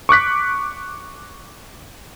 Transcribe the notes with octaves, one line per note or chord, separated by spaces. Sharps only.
C#6 D6 F#6 B6